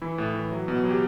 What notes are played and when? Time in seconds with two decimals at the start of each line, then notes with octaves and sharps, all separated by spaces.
0.02 E3 E4
0.18 A2
0.34 E3
0.52 F#3
0.68 B2
0.84 F#3
0.90 G4